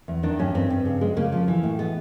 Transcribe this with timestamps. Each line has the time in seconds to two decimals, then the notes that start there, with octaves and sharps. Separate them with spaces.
0.08 E2
0.23 D#3 D4
0.39 G2 C#4
0.54 G2 C4
0.70 G2
0.85 C#3
1.01 G#3
1.17 C#3 A#3
1.32 F3
1.48 E3
1.63 A2
1.79 G#3 B3